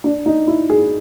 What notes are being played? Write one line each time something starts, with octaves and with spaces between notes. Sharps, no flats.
D4
D#4
E4
G#4